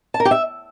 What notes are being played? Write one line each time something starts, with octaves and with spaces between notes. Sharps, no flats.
A5
A#4
G4
E5